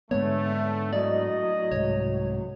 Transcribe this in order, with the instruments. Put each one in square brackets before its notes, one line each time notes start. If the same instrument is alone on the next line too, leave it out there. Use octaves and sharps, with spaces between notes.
[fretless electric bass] G#2 G#3 B3 [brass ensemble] D3 A3 [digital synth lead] C#5
[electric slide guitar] A2 F#3 [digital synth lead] D5 [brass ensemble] D#5
[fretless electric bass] C2 G#2 [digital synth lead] C#5